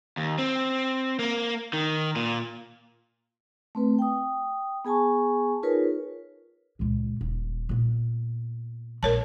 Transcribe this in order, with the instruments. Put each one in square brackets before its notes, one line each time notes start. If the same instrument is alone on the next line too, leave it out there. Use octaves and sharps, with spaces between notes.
[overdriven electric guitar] D#2
C4
A#3
D#3
A#2
[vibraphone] A3 C4 B4
G5 D#6
B3 G#4 G#5 A5 C#6
D#4 F4 G#4 A#4 B4 C#5
[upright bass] C#2 A#2
D#1
A#2 B3
[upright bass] A#1 [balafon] A#4 C#5 A5